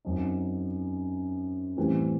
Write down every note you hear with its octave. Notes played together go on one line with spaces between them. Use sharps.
F#2 F#3 C4 D#4
A2 E3 G3 C4